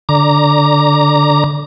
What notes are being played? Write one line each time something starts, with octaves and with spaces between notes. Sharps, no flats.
D3 A#5 D6